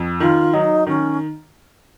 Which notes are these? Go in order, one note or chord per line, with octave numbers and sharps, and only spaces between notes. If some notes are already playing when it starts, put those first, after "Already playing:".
Already playing: F2
D#3 F4
F#3 D#4
D#3 C#4